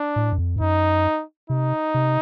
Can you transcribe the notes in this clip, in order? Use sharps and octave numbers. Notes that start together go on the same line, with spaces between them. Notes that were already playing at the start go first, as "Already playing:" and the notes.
Already playing: D4
A2
F#2
F2
G2
F#2 D#4
C3 D#4
C3